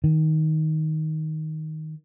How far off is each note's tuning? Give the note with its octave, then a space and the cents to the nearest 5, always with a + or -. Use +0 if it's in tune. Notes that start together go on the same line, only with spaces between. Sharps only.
D#3 +10